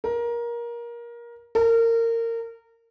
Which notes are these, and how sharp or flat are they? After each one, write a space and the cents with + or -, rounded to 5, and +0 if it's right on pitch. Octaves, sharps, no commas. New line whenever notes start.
A#4 +20
A#4 -25